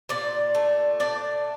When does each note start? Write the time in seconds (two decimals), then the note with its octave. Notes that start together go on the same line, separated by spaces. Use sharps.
0.09 A#2 D5
0.55 A3
1.00 D4 D5